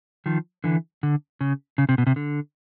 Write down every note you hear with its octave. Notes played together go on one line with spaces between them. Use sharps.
D#3 F3
D3 E3
D3
C#3
C#3
C3
B2
C3
D3